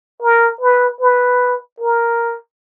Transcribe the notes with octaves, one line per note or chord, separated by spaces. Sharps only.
A#4
B4
B4
A#4